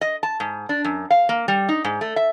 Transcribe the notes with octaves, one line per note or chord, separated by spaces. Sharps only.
D#5
A5
G#2
D4
F#2
F5
A#3
G3
D#4
G#2
A3
E5